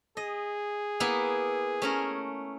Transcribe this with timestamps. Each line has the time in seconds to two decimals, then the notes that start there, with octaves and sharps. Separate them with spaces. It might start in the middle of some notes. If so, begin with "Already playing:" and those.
0.17 G#4 D#5
1.00 A#3 B3 E4
1.82 A3 C#4 A#4